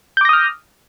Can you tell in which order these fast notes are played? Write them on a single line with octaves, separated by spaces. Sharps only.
G6 D6 A#6 D#6 F6